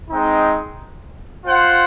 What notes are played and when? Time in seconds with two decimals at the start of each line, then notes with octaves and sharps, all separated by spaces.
0.10 G#3 C4 D#4
1.46 F4 C5 F#5